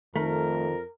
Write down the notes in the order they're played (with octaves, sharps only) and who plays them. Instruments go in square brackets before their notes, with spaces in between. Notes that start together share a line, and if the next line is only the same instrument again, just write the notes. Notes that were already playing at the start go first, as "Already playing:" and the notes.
[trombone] F2 [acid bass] D#3 [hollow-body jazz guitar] A3 [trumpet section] A#4